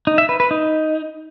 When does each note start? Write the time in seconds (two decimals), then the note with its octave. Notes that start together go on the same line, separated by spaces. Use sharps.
0.07 D#4
0.18 E5
0.29 B4
0.40 B4
0.51 D#4